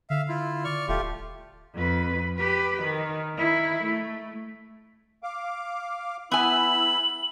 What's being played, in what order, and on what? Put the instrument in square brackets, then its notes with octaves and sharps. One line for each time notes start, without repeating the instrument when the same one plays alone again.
[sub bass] D3 [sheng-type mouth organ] E5 F5
[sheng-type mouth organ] E4 F4
D5 C#6 F6
[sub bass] D#1 [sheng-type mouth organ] A3 F4 G4
[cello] F2 B4
G4 B4
D#3
D#3 E4
A3
[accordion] F5 D6
[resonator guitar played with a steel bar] B3 G#5 [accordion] E4 B5 E6 [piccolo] F#7